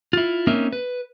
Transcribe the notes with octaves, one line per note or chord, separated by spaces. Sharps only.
E4 F4
A#3 C4 C#4 D#4 A#4 E5
B4